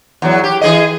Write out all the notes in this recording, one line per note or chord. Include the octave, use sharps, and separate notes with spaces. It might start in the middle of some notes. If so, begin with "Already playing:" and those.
E2 F#3
G4
E3 G#4 D#5